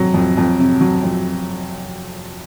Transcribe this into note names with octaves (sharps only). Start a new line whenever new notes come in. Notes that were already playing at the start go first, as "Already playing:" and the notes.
Already playing: F2 C3 F#3
F2
F2
C3
F#3
F2